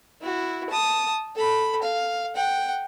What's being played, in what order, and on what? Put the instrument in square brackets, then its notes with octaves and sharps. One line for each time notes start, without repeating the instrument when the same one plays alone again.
[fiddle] E4 F#4
A5 D#6
A4 B5
F5
F#5 G5